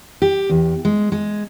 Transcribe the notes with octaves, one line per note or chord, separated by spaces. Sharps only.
G4
E2
G#3
G#3